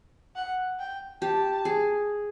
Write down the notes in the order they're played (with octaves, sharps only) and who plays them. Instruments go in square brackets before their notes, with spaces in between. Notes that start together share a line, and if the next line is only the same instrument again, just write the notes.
[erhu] F#5
G5
[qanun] G4 [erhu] A5
[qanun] G#4